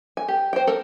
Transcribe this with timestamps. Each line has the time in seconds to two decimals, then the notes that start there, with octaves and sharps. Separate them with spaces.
0.17 G#5
0.28 G4
0.53 C5 G5
0.67 A4 A#4